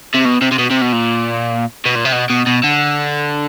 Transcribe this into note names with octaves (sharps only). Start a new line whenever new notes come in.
C3
B2
C3
C3
B2
C3
B2
A#2
B2
A#2
C3
B2
B2
B2
D3